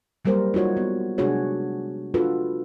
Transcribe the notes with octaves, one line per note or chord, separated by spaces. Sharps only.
F#3 G3 A#3 A#4 C5
D#4 F4 F#4 C#5
B3
C3 G#3 D4 F#4 G#4 C#5
D4 F4 F#4 A4 B4